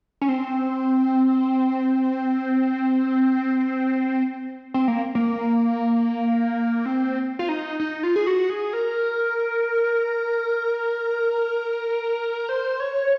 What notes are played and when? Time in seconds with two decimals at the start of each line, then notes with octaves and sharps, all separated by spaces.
0.21 C#4
0.29 C4
4.74 C4
4.88 A#3
5.15 A#3
6.86 C4
7.39 F4
7.49 D#4
7.80 D#4
8.03 F4
8.16 G#4
8.27 F#4
8.50 G#4
8.73 A#4
12.49 C5
12.80 C#5